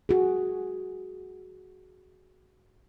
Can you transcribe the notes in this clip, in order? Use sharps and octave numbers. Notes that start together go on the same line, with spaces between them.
F#4 G#4